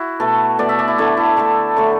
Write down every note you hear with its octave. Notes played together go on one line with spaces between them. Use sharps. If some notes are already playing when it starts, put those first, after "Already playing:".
Already playing: E4 F#4
B2 A3 A4
B2 A3 D5
E5
D5
E4
D3 A3 E4
E4
D3 A3 A4
D3 F#3 A3